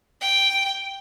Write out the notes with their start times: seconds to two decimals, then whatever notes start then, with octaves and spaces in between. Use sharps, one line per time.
0.21 G5